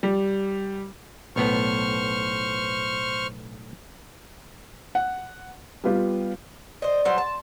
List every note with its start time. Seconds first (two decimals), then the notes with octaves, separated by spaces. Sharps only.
0.03 G3
1.36 B1 A2 B3 C5 C#6 F6
4.95 F#5
5.84 G3 B3 F4 G4
6.82 C5 D5 D#5
7.05 F#3 G3 C5 C6
7.18 A5